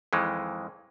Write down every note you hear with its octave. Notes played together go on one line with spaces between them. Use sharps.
F2 D#3 E3 G#3